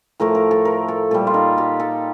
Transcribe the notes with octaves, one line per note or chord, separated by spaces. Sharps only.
A2 F3 A3 A#4
A#4
A4
A#4
A4
A#2 G3 A4
F4
D#4
G4
A4